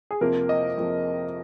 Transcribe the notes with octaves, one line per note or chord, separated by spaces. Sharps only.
G#4
F2 C3 F3 A#3 A#4
D#5
F2 C3 F3 A#3